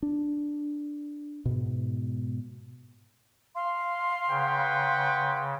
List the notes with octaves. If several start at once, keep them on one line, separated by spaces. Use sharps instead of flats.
D4
G#2 B2
F5 C6
C#3 B4 F#5 G5